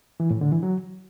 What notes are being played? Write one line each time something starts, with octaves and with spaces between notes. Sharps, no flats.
E3
A2
D3
E3
F#3